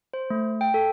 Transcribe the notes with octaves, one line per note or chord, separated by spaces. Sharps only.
C5
A3
G5
A4